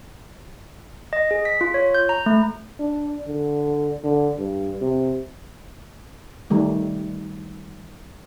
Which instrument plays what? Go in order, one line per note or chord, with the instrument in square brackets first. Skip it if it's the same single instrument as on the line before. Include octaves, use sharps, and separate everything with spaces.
[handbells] D#5
G#4
B6
F4
C#5
G6
A#5
A3
[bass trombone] D4
D3
D3
G2
C3
[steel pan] D#3 G3 A3